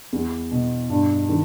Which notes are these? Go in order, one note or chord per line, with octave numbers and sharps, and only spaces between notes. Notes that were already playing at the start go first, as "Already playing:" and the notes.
E2
B2
G2
D#3